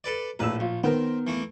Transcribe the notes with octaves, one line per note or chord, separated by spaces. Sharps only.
A4 B4 D5
A#1 A2 B4 E6
A#1 F4
D#3 B3 C4 A#4
E3 A3 A#3